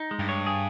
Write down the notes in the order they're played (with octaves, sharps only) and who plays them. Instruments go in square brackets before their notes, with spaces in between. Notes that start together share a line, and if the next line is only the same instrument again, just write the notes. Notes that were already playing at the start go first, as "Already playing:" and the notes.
Already playing: [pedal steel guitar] D#4
G#3
[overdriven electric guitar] G2
[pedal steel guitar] C#5
G#4